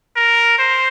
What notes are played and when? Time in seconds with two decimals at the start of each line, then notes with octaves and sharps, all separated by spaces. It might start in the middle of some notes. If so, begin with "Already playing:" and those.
0.16 A#4
0.58 C5